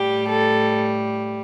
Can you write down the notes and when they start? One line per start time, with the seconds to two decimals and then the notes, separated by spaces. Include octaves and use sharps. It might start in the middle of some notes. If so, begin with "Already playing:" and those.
Already playing: A2 G3 G4
0.27 A4